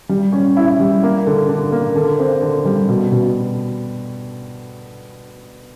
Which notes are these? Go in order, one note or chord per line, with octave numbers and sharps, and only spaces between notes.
G3
C#4
E4
G3
A#3
D3
D3
A#3
D3
C4
D3
G3
B2
B2